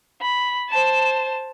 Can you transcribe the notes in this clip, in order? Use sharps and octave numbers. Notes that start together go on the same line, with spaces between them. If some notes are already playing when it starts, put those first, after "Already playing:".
B5
C5 A5